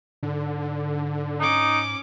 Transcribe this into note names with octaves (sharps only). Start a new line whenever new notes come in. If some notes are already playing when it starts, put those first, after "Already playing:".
G#2 D3
C#4 D#4 D6